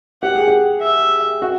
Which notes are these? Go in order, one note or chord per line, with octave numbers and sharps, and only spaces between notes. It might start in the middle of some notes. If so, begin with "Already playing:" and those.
G4 F#5
G#4
G4
E5
F#4